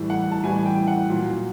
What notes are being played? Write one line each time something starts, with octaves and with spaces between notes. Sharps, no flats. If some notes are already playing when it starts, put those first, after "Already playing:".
Already playing: A2 E3 G3
F#5
A5
A2 E3 G3 G#5
G5
F#5
A#2 F#3